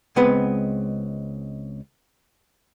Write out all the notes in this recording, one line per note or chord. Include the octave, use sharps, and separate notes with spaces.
C#2 G#3 B3 C4 B4 F#5